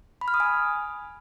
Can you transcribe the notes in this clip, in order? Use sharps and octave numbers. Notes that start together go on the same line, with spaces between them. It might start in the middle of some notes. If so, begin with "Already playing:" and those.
B5
F6
D#6
G#5